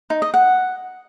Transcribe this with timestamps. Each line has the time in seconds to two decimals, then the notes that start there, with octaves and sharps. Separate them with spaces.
0.10 D#4
0.22 D#5
0.34 F#5